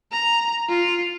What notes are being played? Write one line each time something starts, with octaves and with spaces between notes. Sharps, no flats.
A#5
F4